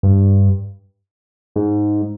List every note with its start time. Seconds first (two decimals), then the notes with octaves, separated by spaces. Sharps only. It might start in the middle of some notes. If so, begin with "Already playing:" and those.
0.03 G2
1.56 G#2